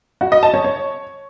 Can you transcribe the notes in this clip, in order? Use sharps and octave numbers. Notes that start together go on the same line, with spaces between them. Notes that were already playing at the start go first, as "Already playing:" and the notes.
F#4
D#5
A5
C#5
C#5